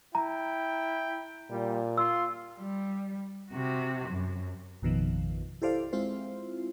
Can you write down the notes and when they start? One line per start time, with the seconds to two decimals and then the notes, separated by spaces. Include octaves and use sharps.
0.15 E4 G5 A#5
1.51 A#2 G3
1.98 F4 C6 E6
2.59 G3
3.51 C3 F#4
4.09 F#2
4.82 A1 F2 B2 D#3 F3
5.62 E4 G4 A4 C5 D5 F5
5.93 G#3 C4 E4 F4 C5